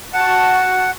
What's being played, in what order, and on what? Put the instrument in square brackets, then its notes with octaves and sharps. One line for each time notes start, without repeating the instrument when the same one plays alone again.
[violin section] F#4 A5 [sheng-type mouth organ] F#5